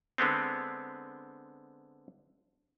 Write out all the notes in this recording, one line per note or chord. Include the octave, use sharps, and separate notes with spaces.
D3 G#3 B3 C4